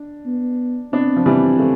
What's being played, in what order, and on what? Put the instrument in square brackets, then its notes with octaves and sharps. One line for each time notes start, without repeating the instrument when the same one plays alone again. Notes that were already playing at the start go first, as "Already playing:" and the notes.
Already playing: [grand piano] D4
[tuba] B3
[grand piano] B3 D4 [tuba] C4
[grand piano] F3
E3 G3
F3 A3